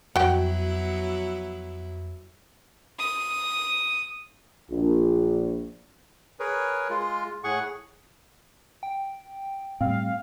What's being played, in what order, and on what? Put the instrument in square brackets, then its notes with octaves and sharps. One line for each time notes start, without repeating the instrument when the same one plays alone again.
[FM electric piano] F2 [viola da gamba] F#3 B3 E4 [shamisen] F#4 G5
[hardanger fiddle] D#6
[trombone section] A#1
[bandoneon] G#4 A#4 B4 C#5
G#3 F4
A2 G#4 F#5 C#6
[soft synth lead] G5
[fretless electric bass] A2 G3 [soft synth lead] C4 [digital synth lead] F5